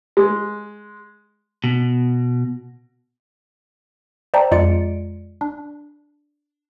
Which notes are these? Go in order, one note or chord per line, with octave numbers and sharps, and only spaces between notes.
G#3
B2
C5 D5 E5 G5 A5 A#5
F2 G#3 F4 D5 C#7 D7
D4